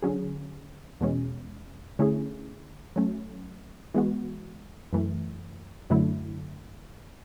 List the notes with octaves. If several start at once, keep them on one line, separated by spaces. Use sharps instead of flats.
D3 F#3 C#4 G#4
E2 B2 G#3 C#4
D3 A3 C#4 E4 G#4
F#3 A3 C#4
E3 G#3 B3 F#4
F#2 E3 A3
F#2 D3 F#3 A3 E4